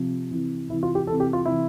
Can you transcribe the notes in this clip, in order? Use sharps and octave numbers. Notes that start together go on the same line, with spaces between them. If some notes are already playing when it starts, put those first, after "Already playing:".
Already playing: C3 F3
C3 E3
C3 E3 E4
F4
G4
E3 A4
C3
G4
F4
C3 E3 E4